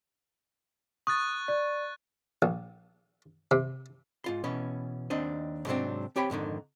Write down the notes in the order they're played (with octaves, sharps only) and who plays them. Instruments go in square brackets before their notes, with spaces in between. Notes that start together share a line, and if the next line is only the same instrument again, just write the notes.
[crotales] C#6 F#6 A6 [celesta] D#6
[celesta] D5
[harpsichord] A#1
C3
[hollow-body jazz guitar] G#2 F4 C6
B2 E3 B3 C#4
D#2 C4 D4 D#5
G#2 C3 F#3 G3 C4 D4
C4 G4 C#5 G5 B5
F2 G#2 D3 D#3